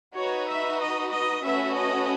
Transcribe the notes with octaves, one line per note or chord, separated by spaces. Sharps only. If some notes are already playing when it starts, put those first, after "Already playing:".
D#4 F#4 B4 C#5
E5
D#5
D#5
A3 C#4 F#4 B4 E5
D#5